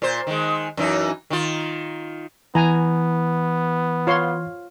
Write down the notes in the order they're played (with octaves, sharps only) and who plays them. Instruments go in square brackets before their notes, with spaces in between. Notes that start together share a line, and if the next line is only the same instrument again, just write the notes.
[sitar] A#2 C5
D#3 G#3
F#2 E3 D#4
D#3 F4
[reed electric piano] E3 [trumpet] B3 [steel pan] G#5 A#5
[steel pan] F4 C#5 C6